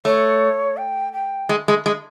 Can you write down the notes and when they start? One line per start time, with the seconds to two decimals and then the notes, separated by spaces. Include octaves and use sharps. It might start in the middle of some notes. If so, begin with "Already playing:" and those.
0.05 A3 C#5
0.77 G5
1.13 G5
1.49 G#3
1.68 G#3
1.86 G#3